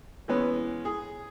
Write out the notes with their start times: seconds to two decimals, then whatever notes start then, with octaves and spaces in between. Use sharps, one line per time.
0.28 E3 G#3 B3 C#4
0.85 G#4